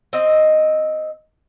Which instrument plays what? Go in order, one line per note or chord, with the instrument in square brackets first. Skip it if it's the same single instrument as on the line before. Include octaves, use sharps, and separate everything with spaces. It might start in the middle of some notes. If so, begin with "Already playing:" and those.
[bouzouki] C4 D#5